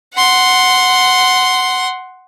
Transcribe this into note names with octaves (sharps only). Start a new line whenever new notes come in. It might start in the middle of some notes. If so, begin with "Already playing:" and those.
F#5 C6